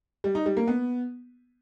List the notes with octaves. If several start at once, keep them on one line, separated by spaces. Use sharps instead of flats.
G3
D#4
G3
A#3
B3